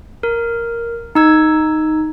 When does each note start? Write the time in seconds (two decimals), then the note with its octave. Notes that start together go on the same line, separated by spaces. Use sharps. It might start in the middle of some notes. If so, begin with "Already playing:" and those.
0.23 A#4
1.15 D#4 E6 G#6